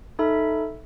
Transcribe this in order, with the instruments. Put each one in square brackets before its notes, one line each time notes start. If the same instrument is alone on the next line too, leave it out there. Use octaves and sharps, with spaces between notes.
[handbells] D#4 A4 E5 B5